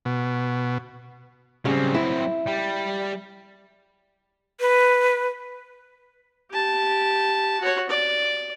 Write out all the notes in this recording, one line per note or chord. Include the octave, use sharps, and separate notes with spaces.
B2
C#3 F#3 G3 C4
E4
G3
B4
G4 A5
F#4 C#5
D5